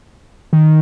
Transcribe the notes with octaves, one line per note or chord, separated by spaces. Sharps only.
D#3